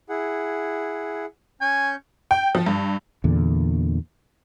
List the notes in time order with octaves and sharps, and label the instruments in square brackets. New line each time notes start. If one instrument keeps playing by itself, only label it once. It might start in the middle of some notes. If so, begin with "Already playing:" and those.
[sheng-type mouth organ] E4 G#4 F#5
[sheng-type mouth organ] C#4 C#6 G6 [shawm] G#5
[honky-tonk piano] G5
F3
G2
[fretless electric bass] E2 A#2 D3